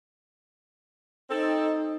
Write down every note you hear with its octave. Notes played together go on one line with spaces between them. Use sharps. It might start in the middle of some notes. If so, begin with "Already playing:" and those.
C4 D#4 A4